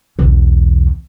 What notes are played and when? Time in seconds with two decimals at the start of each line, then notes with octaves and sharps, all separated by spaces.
0.19 B1 E2